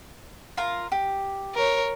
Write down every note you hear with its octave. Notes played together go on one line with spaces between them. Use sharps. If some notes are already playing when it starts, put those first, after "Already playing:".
F4 A#4
G4
A#4 C#5